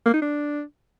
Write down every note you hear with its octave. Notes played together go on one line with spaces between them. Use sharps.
A#3
D#4
D4